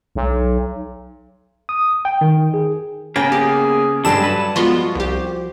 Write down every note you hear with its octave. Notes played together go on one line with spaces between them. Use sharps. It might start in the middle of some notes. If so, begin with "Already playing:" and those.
B1
D#6
G5
D#3
G#4
C#3 A#3 B3 G5 A#5
G4 G#4
G2 D3 G3 G#3 A4 A5 E7
F#3 B4
F3 G#3 B3 F4 F#4 C6
C2 G4 C5